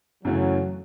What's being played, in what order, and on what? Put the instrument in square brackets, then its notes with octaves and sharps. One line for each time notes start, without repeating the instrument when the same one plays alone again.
[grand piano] F#2 C#3 E3 A3 C#4 [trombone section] F#3